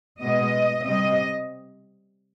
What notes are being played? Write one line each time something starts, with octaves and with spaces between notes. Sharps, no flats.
B2 G#3 B3 D#5
C3 G3 C4 D#5